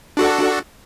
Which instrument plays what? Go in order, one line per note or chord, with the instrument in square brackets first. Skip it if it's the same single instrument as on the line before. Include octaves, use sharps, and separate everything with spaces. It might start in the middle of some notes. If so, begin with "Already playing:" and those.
[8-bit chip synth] D4 F#4 A4